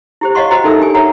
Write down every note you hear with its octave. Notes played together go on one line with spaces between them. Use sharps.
E4 G4 C5
C#5 D#5 F5 F#5 C6 C#6
F#4 B4 C5 D#5 G5 A#5
D#4 A4 A#4 E5 D#6 E6
D4 G4 A#4 G#5
A#4 B4 C#5 E5 F#5 A#5